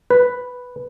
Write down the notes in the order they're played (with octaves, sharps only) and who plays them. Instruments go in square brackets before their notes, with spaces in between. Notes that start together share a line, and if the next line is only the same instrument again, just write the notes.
[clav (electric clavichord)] B4